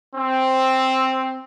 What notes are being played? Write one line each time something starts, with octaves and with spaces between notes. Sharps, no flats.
C4